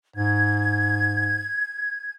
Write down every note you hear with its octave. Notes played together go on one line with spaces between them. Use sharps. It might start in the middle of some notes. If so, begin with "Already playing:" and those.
G#2 G#6